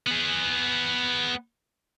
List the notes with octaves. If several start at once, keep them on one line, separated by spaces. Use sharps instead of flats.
B3 G#4